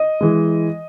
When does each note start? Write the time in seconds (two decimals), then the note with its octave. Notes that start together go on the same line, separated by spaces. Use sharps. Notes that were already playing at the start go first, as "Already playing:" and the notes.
Already playing: D#5
0.21 E3 G#3